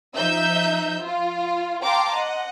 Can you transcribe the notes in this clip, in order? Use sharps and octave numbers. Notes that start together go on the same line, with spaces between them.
F3 D#4 E5 E6 G6
F4
F5 G5 A5 A#5 C6 D6
D#5 F#5